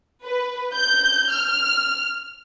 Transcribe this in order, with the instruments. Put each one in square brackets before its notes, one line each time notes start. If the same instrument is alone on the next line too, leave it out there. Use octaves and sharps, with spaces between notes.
[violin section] B4
G6
F6